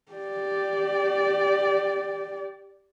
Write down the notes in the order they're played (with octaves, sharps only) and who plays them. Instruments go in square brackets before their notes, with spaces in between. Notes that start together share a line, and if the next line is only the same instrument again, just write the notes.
[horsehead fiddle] G4 D5